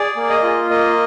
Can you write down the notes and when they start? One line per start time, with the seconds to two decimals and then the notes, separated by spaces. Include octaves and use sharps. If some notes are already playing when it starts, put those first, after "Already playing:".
Already playing: G#4 D5
0.16 A#3
0.30 D#5
0.43 F4
0.70 A#3 D#5